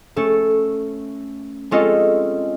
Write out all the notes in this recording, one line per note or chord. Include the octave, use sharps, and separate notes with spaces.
A3 C#4 A4
G#3 C4 C#4 F4 A4 D#5